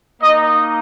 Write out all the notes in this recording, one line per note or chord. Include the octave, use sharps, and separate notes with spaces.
A#3 D#4 D#5